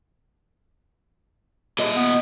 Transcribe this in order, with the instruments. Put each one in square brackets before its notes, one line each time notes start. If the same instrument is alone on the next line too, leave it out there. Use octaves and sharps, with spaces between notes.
[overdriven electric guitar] A#2 D#5
[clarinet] B3